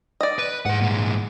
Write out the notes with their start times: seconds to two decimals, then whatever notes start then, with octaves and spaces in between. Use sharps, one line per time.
0.21 D5 D#5
0.39 B4
0.66 G#2 G#4 F#5
0.81 A#2 G#3